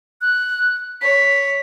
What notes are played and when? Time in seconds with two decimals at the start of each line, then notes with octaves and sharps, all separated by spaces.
0.21 F#6
1.01 C#5 B6